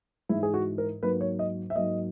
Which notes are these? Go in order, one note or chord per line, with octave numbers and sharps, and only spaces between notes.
G#2 E3 G#3 E4
G#4
F#4
A#4
G#2 F#3 A#3 B4
C#5
D#5
E5
G#2 F#3 A#3 D#5